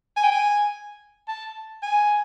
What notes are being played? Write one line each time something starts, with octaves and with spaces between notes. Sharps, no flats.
G#5
G5
G#5
A5
G#5